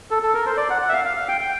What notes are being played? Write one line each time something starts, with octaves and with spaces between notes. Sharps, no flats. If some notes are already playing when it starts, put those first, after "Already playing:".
A4
A4
A#4
C5
D5
F#5
F#5
E5
F5
F5
F5
G5
G5